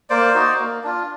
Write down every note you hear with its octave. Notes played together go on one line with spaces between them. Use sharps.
A#3 C5 D5
D#4 F#4
A#3
D4 F4